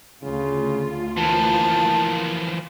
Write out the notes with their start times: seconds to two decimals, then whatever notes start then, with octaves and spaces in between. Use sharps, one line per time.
0.23 D2 C#3 F4
1.17 E3 F3 A#3 A5